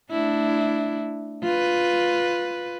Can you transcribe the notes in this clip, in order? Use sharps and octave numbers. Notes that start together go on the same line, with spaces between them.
A3 D4 E4
F4 B4